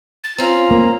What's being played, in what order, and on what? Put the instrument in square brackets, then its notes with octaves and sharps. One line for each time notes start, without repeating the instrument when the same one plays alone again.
[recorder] A6
[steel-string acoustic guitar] C4 C#4 [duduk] F4 [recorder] A#5
[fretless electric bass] A#3